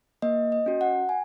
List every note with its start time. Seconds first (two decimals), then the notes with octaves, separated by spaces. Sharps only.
0.22 A#3 D#5
0.52 D#5
0.66 C#4 F#4
0.81 F#5
1.09 G#5